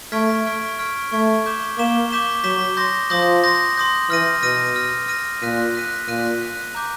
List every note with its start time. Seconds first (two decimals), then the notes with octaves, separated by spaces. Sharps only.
0.12 A3 C#6 F6 G#6 B6 D7
0.46 C#6 F6 G#6 B6 D7
0.79 C#6 F6 G#6 B6 D7
1.12 A3 C#6 F6 G#6 B6 D7
1.46 D6 G6 B6 E7 G7
1.78 A#3 D6 G6 B6 E7 G7
2.10 D6 G6 B6 E7 G7
2.44 F#3 D6 G6 B6 E7 G7
2.77 C6 D#6 G6 A#6
3.10 F3 C6 D#6 G6 A#6
3.44 C6 D#6 G6 A#6
3.76 C6 D#6 G6 A#6
4.10 E3 F6 A#6 D#7
4.42 B2 F6 A#6 D#7
4.76 F6 A#6 D#7
5.08 F6 A#6 D#7
5.42 A#2 F#6 B6 D#7
5.75 F#6 B6 D#7
6.08 A#2 F#6 B6 D#7
6.41 F#6 B6 D#7
6.75 A#5 D6 G6